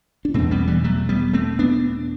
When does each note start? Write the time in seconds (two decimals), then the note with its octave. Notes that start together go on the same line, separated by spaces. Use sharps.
0.25 D4
0.34 E2 B2 A3 C4
0.51 G3 B3
0.67 E3 G3
0.84 F#3 A3
1.09 G3 B3
1.33 A3 C4
1.59 B3 D4